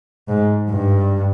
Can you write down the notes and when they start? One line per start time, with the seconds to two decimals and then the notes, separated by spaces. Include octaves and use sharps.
0.28 G#2
0.70 G2